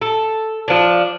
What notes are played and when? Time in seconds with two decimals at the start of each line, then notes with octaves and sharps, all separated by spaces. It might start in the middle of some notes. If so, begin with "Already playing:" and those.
0.02 A4
0.68 F3 D4